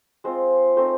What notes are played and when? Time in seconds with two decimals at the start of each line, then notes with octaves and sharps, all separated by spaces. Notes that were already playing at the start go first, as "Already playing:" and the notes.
0.24 G#3 C4 F4 C5
0.77 A3 C4 D#4 C5